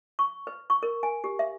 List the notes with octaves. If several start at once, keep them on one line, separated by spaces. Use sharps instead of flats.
C#6
B4
C#6
A#4
G#5
G4
E5